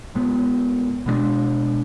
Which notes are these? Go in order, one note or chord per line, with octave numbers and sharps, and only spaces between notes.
A2 G#3 B3
B2 G#3 B3 D4